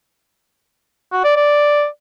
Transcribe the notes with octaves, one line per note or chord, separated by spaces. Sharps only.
F#4
D5
D5